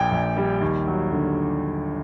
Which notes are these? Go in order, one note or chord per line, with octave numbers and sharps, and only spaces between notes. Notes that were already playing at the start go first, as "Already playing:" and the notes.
Already playing: A#1 A#2 G5
A#1
G3
D#2
F#3
D3